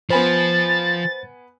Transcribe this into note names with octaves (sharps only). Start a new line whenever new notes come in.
F3 B3 C5 G#5 B5 A6